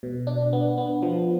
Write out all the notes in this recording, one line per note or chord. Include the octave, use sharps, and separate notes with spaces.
B2
D4
B3
B3
F3